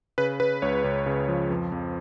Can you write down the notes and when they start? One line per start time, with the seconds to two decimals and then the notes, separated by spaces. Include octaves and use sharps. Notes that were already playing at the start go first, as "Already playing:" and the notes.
0.18 C#3 B4
0.40 C#3 B4
0.62 C#2 C#5
0.84 C#2
1.06 C#3
1.28 F3
1.50 F2
1.72 F2